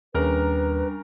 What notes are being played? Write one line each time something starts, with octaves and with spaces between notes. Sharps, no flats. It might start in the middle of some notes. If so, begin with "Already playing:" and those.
D#2 C#3 G3 D4 A#4 B4 A#5